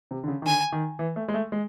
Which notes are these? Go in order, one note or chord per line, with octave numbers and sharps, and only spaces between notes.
C3
D3
C#3
D#3
D3 G#5
D#3
E3
A3
G#3
A3
G#3